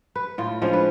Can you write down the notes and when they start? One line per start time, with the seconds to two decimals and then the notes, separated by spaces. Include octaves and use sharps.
0.16 B4
0.38 A2 F4
0.62 F3 G#3 C#4 D4
0.73 B4